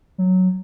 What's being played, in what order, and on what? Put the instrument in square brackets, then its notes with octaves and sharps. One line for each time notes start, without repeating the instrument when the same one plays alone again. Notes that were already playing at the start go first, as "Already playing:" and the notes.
[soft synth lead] F#3